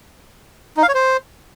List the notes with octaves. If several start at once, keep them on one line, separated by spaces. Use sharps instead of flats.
D#4
F5
C#5
C5